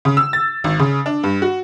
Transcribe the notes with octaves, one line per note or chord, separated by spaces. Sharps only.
C#3
E6
A6
G#1
C#3
D4
G2
F#4